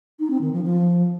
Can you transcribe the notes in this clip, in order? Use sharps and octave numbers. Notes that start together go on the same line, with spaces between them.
D#4
C4
D#3
F3
F3